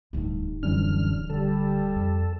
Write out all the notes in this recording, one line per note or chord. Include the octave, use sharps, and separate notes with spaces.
D1 D2 G2 D#4
F#2 D3 E3 G3 C#4 F6
D3 G3 A4
F2